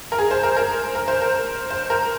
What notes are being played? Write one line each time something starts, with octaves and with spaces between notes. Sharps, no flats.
A#4
G#4
C5
A#4
A#4
A#4
C5
A#4
C5
A#4